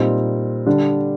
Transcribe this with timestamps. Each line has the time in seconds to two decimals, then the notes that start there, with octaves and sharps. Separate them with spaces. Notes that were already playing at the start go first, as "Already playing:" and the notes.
Already playing: A#2 G3 C4 D#4
0.67 D3 G3 D4